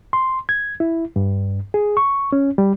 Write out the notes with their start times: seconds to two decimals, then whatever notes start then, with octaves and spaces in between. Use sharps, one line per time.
0.13 C6
0.49 G#6
0.80 E4
1.16 G2
1.74 G#4
1.97 C#6
2.32 C#4
2.58 G3